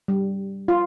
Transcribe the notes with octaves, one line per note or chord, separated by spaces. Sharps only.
G3
F4